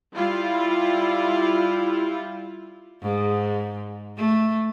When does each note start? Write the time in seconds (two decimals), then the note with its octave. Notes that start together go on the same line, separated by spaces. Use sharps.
0.12 G3 E4 F4
3.02 G#2
4.17 A3